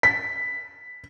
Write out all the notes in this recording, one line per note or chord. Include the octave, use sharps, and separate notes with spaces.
B6